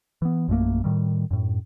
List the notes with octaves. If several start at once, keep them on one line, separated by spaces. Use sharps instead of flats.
E3 B3
A#1 F#2 A3 A#3
A2 D#3 G3
F#2 A2